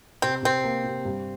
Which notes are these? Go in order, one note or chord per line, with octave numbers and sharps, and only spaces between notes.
C3 C4
C3 C4
A#3
C3
G2